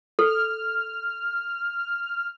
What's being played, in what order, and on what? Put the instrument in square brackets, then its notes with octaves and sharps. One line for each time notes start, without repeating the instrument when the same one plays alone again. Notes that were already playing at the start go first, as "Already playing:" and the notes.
[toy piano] A4 [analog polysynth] F6